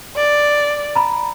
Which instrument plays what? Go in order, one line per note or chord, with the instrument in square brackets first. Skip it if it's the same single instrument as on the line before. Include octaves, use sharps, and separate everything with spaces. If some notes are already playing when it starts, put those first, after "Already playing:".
[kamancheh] D5
[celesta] A#5 B5